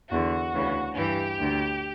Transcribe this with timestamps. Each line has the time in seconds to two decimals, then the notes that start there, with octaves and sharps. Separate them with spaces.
0.11 E2 D3 F#4
0.54 D2 C#3 E3
0.96 G2 E3 G4
1.39 D2 D3